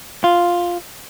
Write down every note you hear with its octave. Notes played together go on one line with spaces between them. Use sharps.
F4